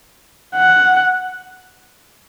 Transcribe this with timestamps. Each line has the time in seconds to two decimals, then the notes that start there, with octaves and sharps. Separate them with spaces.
0.56 F#5